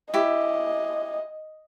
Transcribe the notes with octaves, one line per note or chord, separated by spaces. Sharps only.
E4 G4 D#5